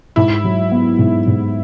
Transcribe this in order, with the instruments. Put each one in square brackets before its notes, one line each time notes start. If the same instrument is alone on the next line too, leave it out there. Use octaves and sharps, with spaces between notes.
[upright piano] G#2 [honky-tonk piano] E4
[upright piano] F#3
B3
G#2
G#2